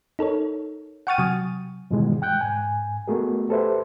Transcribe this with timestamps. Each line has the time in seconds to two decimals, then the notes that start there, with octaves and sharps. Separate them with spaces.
0.19 D#4 A4 A#4 C#5
1.07 F#5 G5 C#6 F6 A6 D#7
1.18 C3 F#3 G#5 D#6
1.91 G2 B2 D#3 E3 G3 G#3
2.22 G5 F#6 G6
2.41 G#2 G#5
3.08 A3 B3 F#4 G#4 A#4
3.49 G4 A4 B4 C5 E5